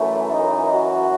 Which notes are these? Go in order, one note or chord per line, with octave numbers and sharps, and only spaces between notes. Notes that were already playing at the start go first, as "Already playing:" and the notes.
Already playing: F#2 E3 A3
D#4
F#4